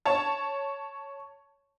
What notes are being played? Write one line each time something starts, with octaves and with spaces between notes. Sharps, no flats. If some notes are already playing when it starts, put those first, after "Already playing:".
C#5 A5